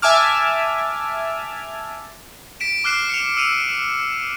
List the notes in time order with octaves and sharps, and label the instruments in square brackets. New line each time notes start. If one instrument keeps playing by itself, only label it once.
[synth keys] E5 G#5 A5 D6 F6
[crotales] B6 D7 E7
D6 F6 F#6 C7 E7
C#7 F7
E6 C#7 D#7 F7